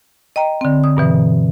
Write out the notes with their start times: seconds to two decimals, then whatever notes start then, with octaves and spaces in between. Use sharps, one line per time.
0.36 D#5 G5 A#5
0.61 D3 C4
0.84 D#6
0.97 G2 B2 E3